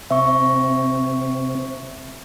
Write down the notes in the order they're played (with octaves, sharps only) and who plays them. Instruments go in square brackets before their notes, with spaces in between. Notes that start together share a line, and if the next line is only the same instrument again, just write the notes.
[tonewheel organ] C3 C4 [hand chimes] E5 C#6